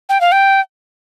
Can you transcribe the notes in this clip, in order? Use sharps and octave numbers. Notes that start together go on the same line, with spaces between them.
G5
F5
G5